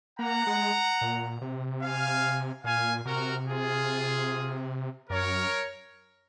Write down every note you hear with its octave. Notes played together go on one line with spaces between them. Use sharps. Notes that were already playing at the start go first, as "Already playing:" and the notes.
A#3 F#5 A#5
G#3
A#2
C3
F5 G#5
A#2 F5 G#5
C3 F#4 A#4
F4 G#4
F#2 A#4 C#5